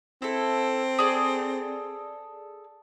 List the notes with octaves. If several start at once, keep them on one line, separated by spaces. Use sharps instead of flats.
C4 E4 A4
G#4 A4 D5